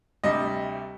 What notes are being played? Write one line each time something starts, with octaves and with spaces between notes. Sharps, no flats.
D2 C3 G3 D#5